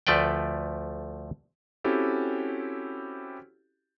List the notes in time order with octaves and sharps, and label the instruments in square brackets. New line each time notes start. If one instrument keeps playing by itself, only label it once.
[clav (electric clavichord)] D2 F3 A3 B4 D5 G5
[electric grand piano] C4 C#4 E4 F#4 G4 A4